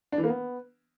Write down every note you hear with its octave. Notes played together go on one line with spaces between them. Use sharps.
D4
E3
A#3
B3